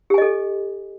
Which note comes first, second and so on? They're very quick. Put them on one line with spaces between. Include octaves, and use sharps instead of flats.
G4 G#5 D#5 A4